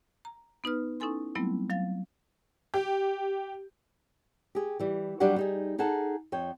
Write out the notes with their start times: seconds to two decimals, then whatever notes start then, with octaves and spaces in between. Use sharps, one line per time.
0.25 A#5
0.64 B3 D#4 B4 F6
1.00 C#4 D#4 E4 A4 G#5 C6
1.36 F#3 G3 A3 B3 C4 E4
1.69 F#3 F5 A6
2.74 G4
4.55 G4 G#4
4.80 E3 G3
5.20 F#3 G3 B3 D4 G4 F#5
5.36 G3 D#4 G#4
5.78 D#4 G#4 A4 F#5 A5
6.32 F2 C#5 G5